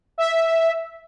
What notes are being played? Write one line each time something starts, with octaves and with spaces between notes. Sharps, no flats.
E5